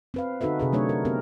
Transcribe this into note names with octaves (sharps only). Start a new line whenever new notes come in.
C4 B4 F5
D3 D#4 F#4 A4 B4 E5
C3 G#4 B4
F#3 A3 D4 C#5
A#4
B3 C4 G4 A#4